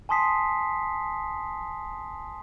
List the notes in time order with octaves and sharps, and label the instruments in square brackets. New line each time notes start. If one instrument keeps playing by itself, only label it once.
[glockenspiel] G#5 A5 C6 D#6 B6 C7